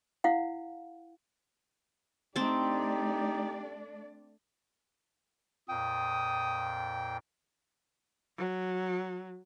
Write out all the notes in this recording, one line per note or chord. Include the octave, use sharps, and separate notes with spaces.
E4 F5 F#5
A3 C4 D4 D#4 G4 D5 A5
F2 A#2 G5 D#6
F#3